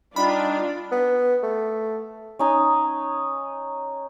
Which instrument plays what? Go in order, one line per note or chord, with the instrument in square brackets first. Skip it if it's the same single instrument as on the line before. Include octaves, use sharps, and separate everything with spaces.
[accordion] G3 [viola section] D4 F4 [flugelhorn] D#4 [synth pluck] B5
[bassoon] B3
A3
[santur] C#4 D#4 G#5